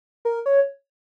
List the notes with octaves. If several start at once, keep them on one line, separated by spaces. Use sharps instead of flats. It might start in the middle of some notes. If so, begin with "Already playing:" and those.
A#4
C#5